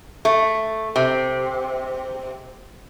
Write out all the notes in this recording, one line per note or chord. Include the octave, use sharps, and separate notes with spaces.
A3
C3